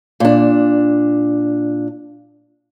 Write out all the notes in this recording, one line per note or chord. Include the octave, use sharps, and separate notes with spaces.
A#2 D4